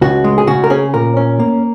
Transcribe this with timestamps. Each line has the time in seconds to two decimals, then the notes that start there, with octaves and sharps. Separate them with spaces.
0.01 C#2 F#4
0.24 G#3
0.38 G#4
0.47 C#3 F#4
0.64 A#4
0.70 C#4 G#4
0.94 A#2 A#4
1.17 C#4
1.39 A#3